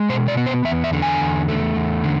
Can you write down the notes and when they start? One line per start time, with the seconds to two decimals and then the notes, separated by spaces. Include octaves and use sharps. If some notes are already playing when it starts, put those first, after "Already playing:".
Already playing: G#3
0.09 B2 C5
0.28 D5
0.37 B3
0.46 C5
0.65 E2 E5
0.84 E5
0.93 D3
1.02 G#5
1.20 E2
1.48 A3
1.76 E2
2.04 D3